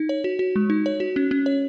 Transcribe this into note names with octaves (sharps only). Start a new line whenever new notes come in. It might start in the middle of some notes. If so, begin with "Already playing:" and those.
Already playing: D#4
C#5
F#4
F#4
G#3
D#4
C#5
F#4
C#4
C#4
C#5